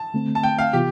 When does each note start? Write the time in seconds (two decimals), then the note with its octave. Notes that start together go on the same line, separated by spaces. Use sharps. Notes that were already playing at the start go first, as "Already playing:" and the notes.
Already playing: A5
0.14 D3 A3 C4
0.35 A5
0.43 G5
0.59 F5
0.73 C3 E3 B3 F4 G4